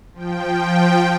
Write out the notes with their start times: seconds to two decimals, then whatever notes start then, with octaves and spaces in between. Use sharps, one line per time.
0.14 F3 G5